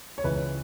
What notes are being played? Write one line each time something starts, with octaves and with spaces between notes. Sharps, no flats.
C#5
C#2 C#3 E3 B4